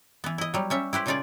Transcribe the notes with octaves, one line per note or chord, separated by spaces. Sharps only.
E3 B3
E4 D#5
F#3 G3
G3 C#4 E5
E4 G4 B4 C5
A#2 C#3 D#4 F4 G#4 D5